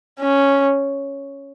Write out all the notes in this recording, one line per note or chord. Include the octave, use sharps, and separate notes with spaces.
C#4